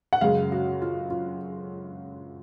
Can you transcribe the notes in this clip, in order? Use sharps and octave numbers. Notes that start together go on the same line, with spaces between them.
F#5
F#2 C#3 G#3 F5
F#4
F4
F4